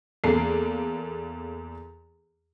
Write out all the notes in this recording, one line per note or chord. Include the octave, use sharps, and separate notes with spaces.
E2 A#3 A4 C7